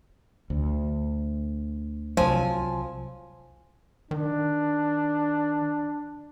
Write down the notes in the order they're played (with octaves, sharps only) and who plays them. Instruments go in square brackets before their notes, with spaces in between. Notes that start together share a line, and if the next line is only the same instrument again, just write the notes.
[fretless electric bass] D2
[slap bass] C2 F#3 [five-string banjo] F3 [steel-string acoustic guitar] G#5
[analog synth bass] D#3 [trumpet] D4